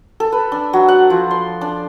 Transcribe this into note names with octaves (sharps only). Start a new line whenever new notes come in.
A4
B4
D4
F#3
F#5
F3
C6
D4